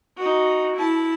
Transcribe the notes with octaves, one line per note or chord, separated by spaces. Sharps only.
D#4 F#4
E4 A5